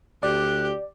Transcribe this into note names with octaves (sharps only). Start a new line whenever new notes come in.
D2 G4 D5 F#6